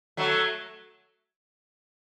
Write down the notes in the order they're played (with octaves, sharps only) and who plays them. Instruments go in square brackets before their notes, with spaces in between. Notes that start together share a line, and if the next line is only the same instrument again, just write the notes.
[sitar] F#3 A3